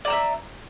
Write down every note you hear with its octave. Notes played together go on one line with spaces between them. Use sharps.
D5 E5 A#5 E6